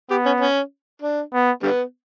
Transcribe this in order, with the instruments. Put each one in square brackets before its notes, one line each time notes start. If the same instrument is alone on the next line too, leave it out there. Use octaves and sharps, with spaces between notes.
[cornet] B3 [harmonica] G4
[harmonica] C#4
C#4
D4
[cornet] B3
[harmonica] D3 G3 B3